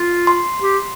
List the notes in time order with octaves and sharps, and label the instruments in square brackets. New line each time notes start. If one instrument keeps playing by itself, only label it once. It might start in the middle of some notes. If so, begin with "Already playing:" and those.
Already playing: [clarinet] F4
[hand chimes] C6
[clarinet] G4